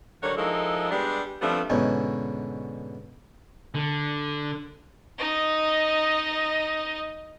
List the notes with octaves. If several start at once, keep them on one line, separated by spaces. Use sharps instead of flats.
D3 F#3 G3 F#4 A#4 C#5
F3 G#3 D#4 E4 A4 A#4
G3 G#3 B3 D4
F3 G3 A3 B3 C4 D4
G#2 B2 D3 C#4 D#4 E4
D3
D#4 D#5